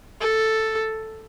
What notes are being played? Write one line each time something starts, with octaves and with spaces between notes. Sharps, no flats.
A4